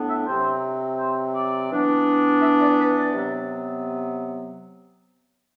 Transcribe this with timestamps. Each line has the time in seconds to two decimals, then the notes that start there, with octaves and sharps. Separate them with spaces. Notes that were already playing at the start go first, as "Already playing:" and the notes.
Already playing: A2 B3 D4
0.09 E5
0.27 C3 F#3 C4 C5
0.99 C5
1.34 D5
1.71 E3 B3 D4
2.41 E5
2.59 D5
2.78 B4
2.96 D5
3.13 C3 F#3 B3